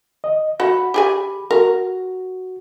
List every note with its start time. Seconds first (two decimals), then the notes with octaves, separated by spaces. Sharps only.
0.24 D#5
0.60 F#4 F#5 B5
0.94 G4 G#4 G#5
1.51 F#4 A#4